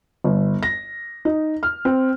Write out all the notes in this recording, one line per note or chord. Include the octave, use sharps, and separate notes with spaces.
G1
A#6
D#4
F6
C4